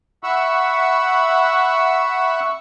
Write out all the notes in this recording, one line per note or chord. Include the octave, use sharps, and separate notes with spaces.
E5 F#5 B5 C#6 E6